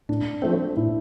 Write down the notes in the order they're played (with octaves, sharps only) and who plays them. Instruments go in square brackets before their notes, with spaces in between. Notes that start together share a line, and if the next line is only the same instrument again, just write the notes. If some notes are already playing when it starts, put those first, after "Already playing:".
[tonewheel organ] A2 [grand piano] D4
[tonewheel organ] F3 A3 C4
[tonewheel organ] A2 [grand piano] E4